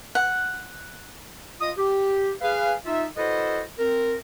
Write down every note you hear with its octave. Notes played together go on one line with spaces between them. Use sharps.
F#5
F4 D#5 D#6
G4
G#4 B4 F5
D#4 F4 E5
E4 F#4 A4 B4 C5 D#5
C4 A#4